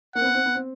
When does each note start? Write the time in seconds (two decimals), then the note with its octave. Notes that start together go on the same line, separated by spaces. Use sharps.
0.15 A#3 F#5
0.21 C4
0.25 B3
0.35 C4
0.46 B3
0.55 C4